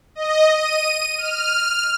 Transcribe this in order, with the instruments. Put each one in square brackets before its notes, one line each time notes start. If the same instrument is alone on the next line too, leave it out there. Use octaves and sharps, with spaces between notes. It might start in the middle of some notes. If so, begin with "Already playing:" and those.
[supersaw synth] D#5
D#7
F6